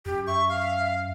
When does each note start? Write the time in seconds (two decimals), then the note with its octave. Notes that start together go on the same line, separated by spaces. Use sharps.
0.06 F#2 G4
0.27 E5 C#6
0.49 F5